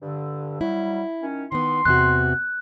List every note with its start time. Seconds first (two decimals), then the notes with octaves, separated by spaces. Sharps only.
0.02 G2 D3
0.61 F#3 G3 E4
1.22 D#3 C#4
1.52 D#3 B3 C6
1.85 E2 C3 F#4 F#6